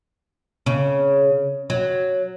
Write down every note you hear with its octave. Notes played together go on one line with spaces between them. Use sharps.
C#3
F#3